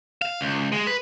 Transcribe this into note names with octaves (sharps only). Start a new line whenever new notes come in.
F5
C#2
G#3
B4